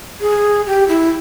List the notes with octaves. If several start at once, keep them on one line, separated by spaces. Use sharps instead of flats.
G#4
G4
E4